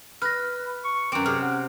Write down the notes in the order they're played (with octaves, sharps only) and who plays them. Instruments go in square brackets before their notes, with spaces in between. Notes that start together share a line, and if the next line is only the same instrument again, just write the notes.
[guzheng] B4 [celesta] F6 A#6
[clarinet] C#6
[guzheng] F#2 C4 [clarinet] D6
[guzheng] C3 [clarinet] G#4 [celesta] F6
[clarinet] F#5